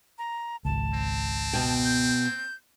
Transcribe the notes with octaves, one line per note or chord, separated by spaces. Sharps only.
A#5
G#1 C#2 A5
C4
B2 G5
G6